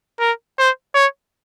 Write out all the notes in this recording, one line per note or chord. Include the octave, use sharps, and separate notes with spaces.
A#4
C5
C#5